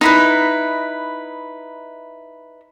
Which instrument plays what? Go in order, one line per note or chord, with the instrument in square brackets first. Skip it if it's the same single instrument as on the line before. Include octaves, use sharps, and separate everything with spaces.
[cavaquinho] D#4 E4 B4